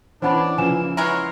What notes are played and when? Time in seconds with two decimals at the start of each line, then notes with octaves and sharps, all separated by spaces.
0.22 E3 C#4 D4 C5 F#5 B5
0.58 C#3 E3 F3 A#3 G#5 E7
0.97 E3 G#3 A#4 C#5 F#5 C6